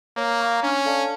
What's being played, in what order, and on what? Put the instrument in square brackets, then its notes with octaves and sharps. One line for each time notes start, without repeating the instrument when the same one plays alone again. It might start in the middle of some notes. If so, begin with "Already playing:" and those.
[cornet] A#3 [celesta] C#5
[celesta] F5 A#5 C#6
[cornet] C#4 [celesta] D4
[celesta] A4 D5 F5 A5